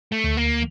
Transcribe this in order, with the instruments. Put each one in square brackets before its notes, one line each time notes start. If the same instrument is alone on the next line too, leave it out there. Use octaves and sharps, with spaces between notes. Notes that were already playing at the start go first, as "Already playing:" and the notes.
[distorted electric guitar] A3
[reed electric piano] D2
[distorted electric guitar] A#3